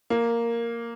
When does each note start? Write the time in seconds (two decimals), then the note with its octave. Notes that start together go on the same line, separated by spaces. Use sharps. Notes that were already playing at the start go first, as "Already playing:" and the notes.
0.10 A#3